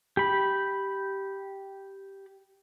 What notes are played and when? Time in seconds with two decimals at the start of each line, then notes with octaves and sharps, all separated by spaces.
0.17 G4 B5